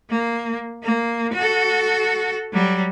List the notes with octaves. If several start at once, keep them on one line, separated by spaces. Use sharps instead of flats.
A#3
A#3
F#4 A4
F#3 G3